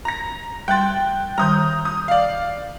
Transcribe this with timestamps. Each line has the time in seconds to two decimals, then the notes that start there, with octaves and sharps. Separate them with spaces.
0.05 A#5 A#6
0.68 G3 G5 C6 F#6 A6
1.38 D#3 G3 A#5 D#6 G6
1.85 D#6
2.08 D5 F5